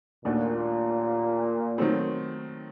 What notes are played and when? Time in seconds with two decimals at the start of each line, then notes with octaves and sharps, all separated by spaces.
0.25 D#2 A#2 D#3 A3 D4 F#4
1.78 D#3 F#3 A3 C4